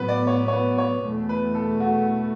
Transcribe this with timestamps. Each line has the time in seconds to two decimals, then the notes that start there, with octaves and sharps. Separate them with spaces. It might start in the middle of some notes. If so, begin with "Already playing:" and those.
Already playing: A2 F#3 B3 B4
0.08 D5
0.27 C#5
0.48 C#5
0.53 B4
0.78 C#5
1.04 E2 B2 A3
1.29 B4
1.55 A4
1.80 F#4